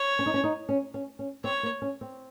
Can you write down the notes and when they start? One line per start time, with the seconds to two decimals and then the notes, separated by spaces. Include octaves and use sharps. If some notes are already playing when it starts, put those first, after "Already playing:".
Already playing: C#5
0.19 C#4
0.26 D#4
0.34 C#4
0.44 D#4
0.69 C#4
0.94 C#4
1.19 C#4
1.44 C4 C#5
1.63 A#3
1.82 C#4
2.01 C4